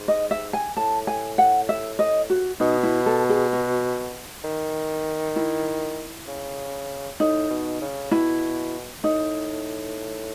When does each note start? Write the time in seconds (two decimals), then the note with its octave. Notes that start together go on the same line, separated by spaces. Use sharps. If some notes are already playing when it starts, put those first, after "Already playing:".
Already playing: G#2
0.08 D#5
0.31 E5
0.53 G#5
0.77 A2 A5
1.07 G#5
1.38 F#5
1.69 E5
1.99 D#5
2.30 F#4
2.60 B2 D#4
2.83 E4
3.06 A4
3.29 G#4
3.53 F#4
4.44 D#3
5.36 E4
6.27 C#3
7.20 A2 D#4
7.50 B2
7.81 C#3
8.11 B2 E4
9.03 A2 D#4